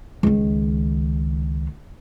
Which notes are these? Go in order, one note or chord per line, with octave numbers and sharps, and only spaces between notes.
C#2 D#3